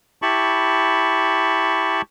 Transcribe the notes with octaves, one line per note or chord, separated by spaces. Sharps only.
E4 G4 A5 B5 C#6